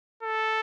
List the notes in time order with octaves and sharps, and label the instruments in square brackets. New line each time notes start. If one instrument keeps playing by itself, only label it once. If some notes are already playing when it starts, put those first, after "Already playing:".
[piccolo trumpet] A4